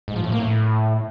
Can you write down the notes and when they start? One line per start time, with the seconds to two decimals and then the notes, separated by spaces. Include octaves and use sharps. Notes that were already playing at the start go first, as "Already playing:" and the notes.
0.08 G#2
0.16 F3
0.24 A2
0.32 A#3
0.40 A2